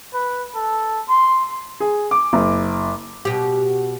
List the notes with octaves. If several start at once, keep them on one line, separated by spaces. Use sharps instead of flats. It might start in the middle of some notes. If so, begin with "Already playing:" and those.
B4
A4
C6
G#4
D6
F#1
B2 G4